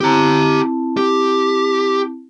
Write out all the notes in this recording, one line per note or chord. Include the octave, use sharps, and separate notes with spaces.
C4 E4 G4 A5 A#5
G4